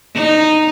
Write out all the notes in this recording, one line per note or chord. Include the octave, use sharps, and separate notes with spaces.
D#4